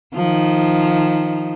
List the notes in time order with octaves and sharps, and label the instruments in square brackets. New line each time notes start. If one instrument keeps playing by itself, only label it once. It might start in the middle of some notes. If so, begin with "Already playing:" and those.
[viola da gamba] D#3 F3